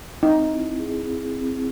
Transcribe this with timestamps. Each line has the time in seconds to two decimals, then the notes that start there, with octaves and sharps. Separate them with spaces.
0.23 C4 D#4
0.51 E4
0.79 G#4
1.07 C4
1.35 C4